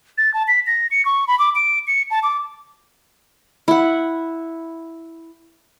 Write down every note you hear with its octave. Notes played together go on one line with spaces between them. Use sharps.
A6
A5
B6
A#6
C#7
C#6
B5
D6
D7
C#7
A5
D6
E4 F#5